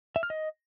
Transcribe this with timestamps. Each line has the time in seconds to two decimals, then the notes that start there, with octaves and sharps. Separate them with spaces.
0.16 E5
0.23 F6
0.30 D#5